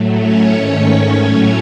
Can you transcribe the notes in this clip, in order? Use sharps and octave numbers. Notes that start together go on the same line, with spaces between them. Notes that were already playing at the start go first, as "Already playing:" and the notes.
Already playing: A2 F#3 A3
C#4 C#5
G#2 D#3 A3
A2 F#3 A3